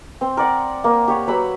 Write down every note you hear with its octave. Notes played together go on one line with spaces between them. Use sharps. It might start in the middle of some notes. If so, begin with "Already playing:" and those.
C4
A#4 D5 F#5
A#3
G4 C#5 F#5
F#3 B4 B5 E6